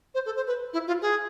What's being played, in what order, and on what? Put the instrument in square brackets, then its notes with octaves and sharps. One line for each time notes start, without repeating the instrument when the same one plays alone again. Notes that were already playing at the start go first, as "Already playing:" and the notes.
[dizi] C5
A4
C5
B4
E4
F4
G#4